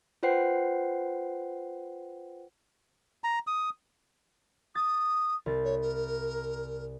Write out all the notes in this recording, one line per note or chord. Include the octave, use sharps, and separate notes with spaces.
F4 B4 C5 F#5 G5 C7
A#5
D#6
D#6 A6
C2 A6
C#5
A#4